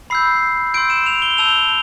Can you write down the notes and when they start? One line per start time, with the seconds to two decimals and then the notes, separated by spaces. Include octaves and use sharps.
0.10 B5 E6 G6 C7
0.74 C6 E6 G6 D7
0.90 E7
1.06 F7
1.22 G7
1.38 A5 E6 G6 F7